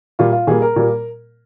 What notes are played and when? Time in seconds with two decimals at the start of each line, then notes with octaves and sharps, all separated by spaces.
0.19 A#2 G3 A#3 F4
0.33 F4
0.47 A#2 G3 A#3 G#4
0.62 A#4
0.76 A#2 G3 A#3